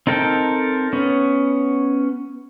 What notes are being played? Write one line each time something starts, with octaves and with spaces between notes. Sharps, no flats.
C4 D#4 A4 A#4 G5
B3 C#4